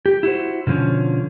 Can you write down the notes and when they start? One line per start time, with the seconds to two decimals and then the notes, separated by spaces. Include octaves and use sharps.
0.06 G4
0.23 E4 F#4 C5
0.67 B2 D3 F3 C#4